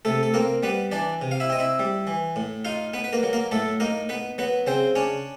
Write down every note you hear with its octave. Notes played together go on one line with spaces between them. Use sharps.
C3 A3 A4
A4
A#3 C4 A#4
G3 B3 B4
E3 D4 D5
C3
F5
E4 E5
C4 D#5
E4 E5
G3
E3
A2
D#4 F4 F5
B3 B4
B4
A#3 A#4
F#3
A#3 A#4
A2 A3 A4
A#3 D#4 A#4
B3 B4
F#3 B3 B4
C#3 C4 C5
C#4 D4 C#5